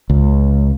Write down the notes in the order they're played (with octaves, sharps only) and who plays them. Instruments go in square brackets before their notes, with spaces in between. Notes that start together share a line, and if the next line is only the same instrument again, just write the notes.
[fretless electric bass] C#2